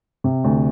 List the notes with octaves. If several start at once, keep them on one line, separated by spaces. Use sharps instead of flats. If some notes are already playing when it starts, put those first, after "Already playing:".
C3
D2